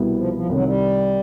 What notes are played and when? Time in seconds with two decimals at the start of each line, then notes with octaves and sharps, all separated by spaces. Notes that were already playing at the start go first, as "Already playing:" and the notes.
Already playing: C2 B2 G3 B3 E4
0.17 F3
0.33 F3
0.49 C2 C3 D#3 F#3
0.65 G3